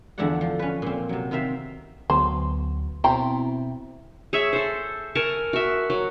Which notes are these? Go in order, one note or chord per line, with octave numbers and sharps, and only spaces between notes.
E2 D3 F3 A3 D5 F#5
F3
C#4 B4
A#2 C4
C3 F#3
D#3 C4 A#4 E5 F5
D2 F#3 B3 C5
B2 C4 E4 C5 G5 A#5
G#4 C#5 E5
A4 C5
A#4 G#5 A5 C#6
F#4 E5
F#3